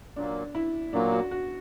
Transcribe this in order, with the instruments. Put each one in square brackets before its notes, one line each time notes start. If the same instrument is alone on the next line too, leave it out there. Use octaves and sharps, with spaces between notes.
[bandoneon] A#2 F#3 A#3 [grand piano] D4
[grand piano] E4
[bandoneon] A#2 F#3 A#3 [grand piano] D4
[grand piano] F#4
F#4